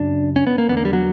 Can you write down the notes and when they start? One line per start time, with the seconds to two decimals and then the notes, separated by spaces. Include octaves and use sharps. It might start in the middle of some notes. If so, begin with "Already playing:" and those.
Already playing: F#2 C#3 D4
0.36 C#4
0.47 B3
0.58 A#3
0.68 E2 D3 B3
0.77 A#3
0.85 G3
0.93 F#3